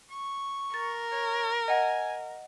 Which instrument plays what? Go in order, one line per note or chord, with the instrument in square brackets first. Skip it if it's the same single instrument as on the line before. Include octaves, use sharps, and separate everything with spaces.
[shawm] C#6
[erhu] A#4 [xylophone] A6
[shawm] C#5
[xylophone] D#5 F#5 [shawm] G#5